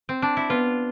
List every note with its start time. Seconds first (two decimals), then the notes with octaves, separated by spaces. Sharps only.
0.09 C4
0.22 D4
0.37 E4
0.49 B3 F4